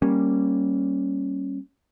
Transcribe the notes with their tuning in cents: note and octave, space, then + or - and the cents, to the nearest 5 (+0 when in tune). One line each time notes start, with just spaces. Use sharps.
G3 +0 A#3 +0 C#4 -15